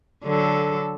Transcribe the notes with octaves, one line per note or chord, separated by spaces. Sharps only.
D3 F#3 A4